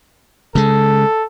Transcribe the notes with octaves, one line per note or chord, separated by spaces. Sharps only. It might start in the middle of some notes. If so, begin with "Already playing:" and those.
C#3 G#3 A4